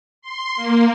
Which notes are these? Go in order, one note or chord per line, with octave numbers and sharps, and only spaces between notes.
C6
A#3